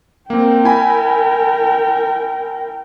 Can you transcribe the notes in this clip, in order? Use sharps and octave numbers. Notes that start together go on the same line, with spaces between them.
A#3 C4 A#4 G5
E4 G#5 B5